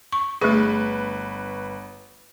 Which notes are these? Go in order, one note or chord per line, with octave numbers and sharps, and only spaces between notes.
C#6
G1 A3 G#4 B4 C#6